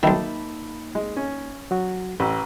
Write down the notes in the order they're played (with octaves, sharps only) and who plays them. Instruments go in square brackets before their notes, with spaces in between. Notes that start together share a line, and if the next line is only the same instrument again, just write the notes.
[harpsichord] B1 D#3 [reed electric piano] A#3 D#4 [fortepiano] E5 A5 B5
[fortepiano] G#3
C#4
[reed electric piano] F#3 F#4
[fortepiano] A1 [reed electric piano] B4 E6